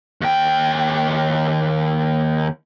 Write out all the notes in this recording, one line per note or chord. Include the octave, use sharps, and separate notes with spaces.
D#2 G5